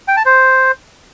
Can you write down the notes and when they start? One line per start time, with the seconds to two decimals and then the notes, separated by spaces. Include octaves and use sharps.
0.08 G5
0.17 A5
0.25 C5